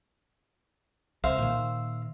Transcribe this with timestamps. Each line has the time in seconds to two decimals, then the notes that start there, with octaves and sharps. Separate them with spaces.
1.24 C2 C5 E5 F5
1.39 A#2 D#3